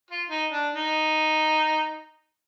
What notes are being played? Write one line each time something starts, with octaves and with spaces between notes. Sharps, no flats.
F4
D#4
D4
D#4